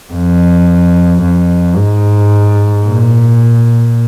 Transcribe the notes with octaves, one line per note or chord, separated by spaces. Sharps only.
F2
F2
G#2
A#2